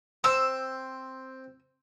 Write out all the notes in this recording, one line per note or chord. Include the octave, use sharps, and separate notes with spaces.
C4 E6